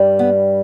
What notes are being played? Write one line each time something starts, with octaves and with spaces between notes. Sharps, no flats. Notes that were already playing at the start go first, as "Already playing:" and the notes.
Already playing: G2 G3
B3